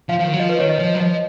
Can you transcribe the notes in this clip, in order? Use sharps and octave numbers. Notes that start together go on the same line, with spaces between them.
F3 F5
F3
D#3
F#3
F3 D#5
B4
D#3 C#5
D#5
F3
F#3
F3 D#5